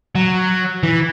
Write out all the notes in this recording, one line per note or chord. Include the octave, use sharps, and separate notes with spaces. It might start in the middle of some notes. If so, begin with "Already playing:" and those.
F#3
E3